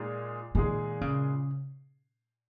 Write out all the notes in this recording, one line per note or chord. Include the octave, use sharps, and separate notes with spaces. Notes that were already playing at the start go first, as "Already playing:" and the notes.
Already playing: A#2 G#3 D#4 G#4
A#2 D#3 G#3 D#4 G#4
C#3